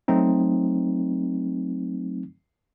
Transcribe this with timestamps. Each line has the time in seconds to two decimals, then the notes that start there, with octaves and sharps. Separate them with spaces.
0.08 F#3 A3 C4 D#4